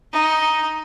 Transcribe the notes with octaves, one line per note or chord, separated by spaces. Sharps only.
D#4